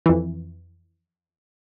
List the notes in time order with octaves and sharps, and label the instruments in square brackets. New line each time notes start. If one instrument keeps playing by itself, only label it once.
[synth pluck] F2 E3